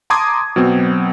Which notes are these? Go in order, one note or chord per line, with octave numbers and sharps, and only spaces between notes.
A5 A#5 C6 D6 D#6 G#6
B2 F#3 B3 C4